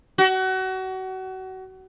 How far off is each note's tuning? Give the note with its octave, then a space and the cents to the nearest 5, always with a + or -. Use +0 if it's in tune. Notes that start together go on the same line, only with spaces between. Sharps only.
F#4 +30